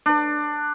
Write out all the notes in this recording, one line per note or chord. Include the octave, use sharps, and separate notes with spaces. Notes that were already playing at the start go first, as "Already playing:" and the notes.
D4